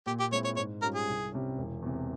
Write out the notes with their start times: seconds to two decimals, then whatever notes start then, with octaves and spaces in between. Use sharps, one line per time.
0.06 A#2 G4
0.20 G4
0.32 G#3 C4 E4 C#5
0.45 C#5
0.56 G#2 C#5
0.82 G3 C#4 F4 A#4
0.94 G#4
1.08 C2
1.32 C3 G3 C#4
1.58 E1
1.82 E2 C3